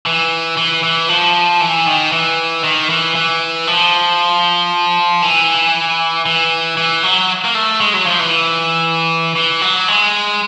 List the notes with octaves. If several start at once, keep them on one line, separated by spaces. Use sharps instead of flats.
E3
E3
E3
F3
E3
D#3
E3
D#3
E3
E3
F3
E3
E3
E3
F#3
A#3
A3
G#3
F#3
F3
E3
E3
F#3
G#3